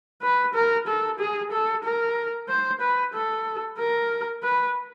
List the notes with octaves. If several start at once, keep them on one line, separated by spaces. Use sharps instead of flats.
B4
A#4
A4
G#4
A4
A#4
C5
B4
A4
A#4
B4